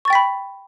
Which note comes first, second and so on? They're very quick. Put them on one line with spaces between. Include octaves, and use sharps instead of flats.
C#6 A6 G5 B6 B5